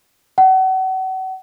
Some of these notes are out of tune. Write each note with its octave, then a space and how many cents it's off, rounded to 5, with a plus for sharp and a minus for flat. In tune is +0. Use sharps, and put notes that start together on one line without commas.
F#5 +35